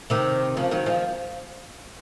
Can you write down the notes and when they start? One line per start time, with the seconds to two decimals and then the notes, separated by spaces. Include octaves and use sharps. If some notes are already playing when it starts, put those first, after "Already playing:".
0.10 C3 D#3
0.57 C#3 F3
0.71 D#3 F#3
0.86 F3 G#3